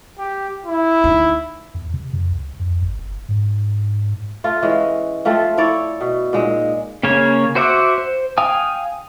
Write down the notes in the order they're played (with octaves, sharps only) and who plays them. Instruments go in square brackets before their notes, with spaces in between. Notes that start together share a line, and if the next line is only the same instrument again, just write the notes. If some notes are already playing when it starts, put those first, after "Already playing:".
[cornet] G4
E4
[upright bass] D2 D#4
[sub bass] E2
C3
F2
C#2
F2
G#1
F#1
G#2
[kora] A3 F4
E3 G#3 C#4
F3 A3 C4 F4
E4 A4 C#5 D5
B2
A#2 G#3 D#4
[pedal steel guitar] C#3 A#3 C#4 C#5
F#4 C5 E5 F#5 D6
C5
F5 G5 G#5 D#6